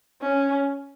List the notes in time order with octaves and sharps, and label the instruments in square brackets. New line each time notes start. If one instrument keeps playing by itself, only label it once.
[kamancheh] C#4